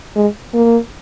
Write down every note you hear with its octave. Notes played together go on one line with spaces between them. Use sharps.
G#3
A#3